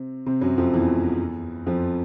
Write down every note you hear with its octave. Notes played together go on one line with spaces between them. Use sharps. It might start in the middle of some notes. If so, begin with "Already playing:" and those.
Already playing: C3 C4
C3 C4
F#2 F#3
F2 F3
E2 E3
F2 F3